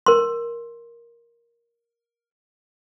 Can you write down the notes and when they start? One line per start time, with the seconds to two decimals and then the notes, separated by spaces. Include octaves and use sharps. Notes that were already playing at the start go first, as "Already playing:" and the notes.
0.06 A#4 C6